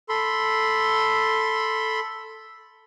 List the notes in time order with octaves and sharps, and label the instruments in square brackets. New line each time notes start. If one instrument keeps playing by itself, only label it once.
[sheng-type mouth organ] A4 B5 C6